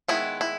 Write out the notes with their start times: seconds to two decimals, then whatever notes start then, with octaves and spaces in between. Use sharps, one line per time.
0.08 D#3 G#3 B3 E4
0.41 E4